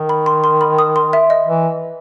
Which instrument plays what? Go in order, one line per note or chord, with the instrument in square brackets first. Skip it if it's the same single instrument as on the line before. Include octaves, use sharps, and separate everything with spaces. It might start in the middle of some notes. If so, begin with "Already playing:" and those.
Already playing: [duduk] D#3
[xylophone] B5
C6
C6
B5
D#6
C6
E5
D#5
[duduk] E3